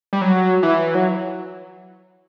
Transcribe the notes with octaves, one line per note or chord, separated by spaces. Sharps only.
G3
F#3
E3
F#3